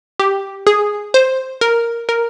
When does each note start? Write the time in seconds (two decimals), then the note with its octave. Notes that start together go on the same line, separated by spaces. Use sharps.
0.20 G4
0.67 G#4
1.14 C5
1.61 A#4
2.09 A#4